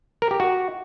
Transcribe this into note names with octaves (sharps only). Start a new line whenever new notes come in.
A#4
G4
F#4